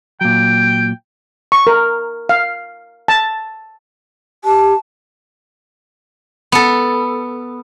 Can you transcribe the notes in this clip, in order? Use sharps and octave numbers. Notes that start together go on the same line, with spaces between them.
A#2 F#3 G5
C#6
A#4
F5
A5
G4 A5
B3 A4